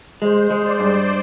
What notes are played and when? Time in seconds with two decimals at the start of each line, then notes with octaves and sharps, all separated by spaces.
0.22 G#3 C5
0.51 G#3
0.65 D5
0.80 G2